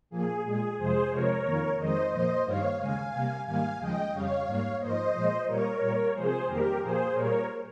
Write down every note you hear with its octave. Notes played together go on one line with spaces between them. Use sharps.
A#2 F3 A#3 G#4
A#2 G#3 G#4
F2 C3 F3 G#3 G#4 C5
C3 F3 G#3 A#4 C#5
F2 D#3 A#3
F2 D#3 G#3 C5 D#5
A#2 F3 A#3 C5 D#5
G2 D#3 G3 A#3 C#5 F5
D#2 C#3 G#3 F5 G#5
C3 G3 A#3
G#2 D#3 G3 A#3 F5 G#5
D#2 C#3 F3 G#3 D#5 G5
F2 C#3 G3 C#5 F5
G#2 G3 A#3
G#2 F3 A#3 C5 D#5
A#2 F3 G#3
A#2 G3 A#3 A#4 C#5
A#2 G3 A#3
C3 F3 G#3 G#4 C5
F2 D#3 G3 A#3 G4 A#4
A#2 F3 A#3 G#4 C5
A#2 G3 A#3 A#4 C#5